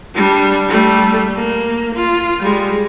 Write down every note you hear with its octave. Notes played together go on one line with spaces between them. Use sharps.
G3 D4
G3 A3
A#3
F4
G3 G#3